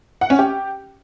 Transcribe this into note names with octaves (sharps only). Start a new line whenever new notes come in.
F#5
C#4
G4